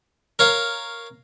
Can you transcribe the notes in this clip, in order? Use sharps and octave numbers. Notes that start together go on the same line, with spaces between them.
A#4 C#5 F5